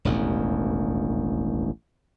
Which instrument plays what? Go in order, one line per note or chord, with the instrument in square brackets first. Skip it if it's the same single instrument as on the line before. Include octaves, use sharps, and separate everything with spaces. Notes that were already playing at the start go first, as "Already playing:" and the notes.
[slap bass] E1 A1 D#2